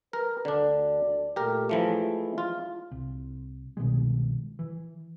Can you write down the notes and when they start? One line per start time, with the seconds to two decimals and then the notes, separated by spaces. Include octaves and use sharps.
0.13 A#4 B4
0.45 D2 D3 D4 D5
1.36 A#2 A3 G4 A#4
1.69 E3 F3 G#3 A3 E4
2.38 F4
2.91 C2
3.77 C2 B2 D#3 G#3
4.59 E3